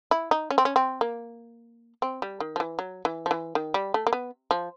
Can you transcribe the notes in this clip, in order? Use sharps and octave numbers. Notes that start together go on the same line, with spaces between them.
E4
D#4
C#4
C4
C#4
C4
A#3
C4
G3
D#3
F3
E3
F#3
E3
F3
E3
D#3
G3
A3
A#3
B3
F3